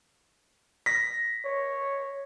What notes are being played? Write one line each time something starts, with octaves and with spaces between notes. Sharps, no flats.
A#6 B6
C#5